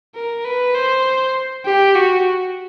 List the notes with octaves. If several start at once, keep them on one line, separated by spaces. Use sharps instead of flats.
A#4
B4
C5
G4
F#4